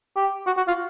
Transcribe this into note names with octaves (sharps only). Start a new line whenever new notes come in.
G4
F#4
F#4
F4